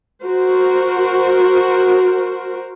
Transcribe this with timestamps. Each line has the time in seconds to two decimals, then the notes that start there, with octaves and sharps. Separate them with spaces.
0.25 F#4 A#4 C5